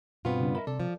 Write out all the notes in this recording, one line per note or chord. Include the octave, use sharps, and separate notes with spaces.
G2 B2 B3 C4 F4
C#3 G3 D4
A#4 D#5 E5 B5
C3 A4 D5
F3